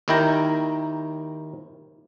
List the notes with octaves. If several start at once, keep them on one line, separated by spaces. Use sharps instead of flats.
D#2 D#3 E4 A#4 G5 A#5